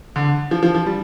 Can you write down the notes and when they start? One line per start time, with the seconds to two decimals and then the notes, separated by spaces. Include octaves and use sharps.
0.16 D3
0.51 F3
0.63 F3
0.75 F3
0.86 G3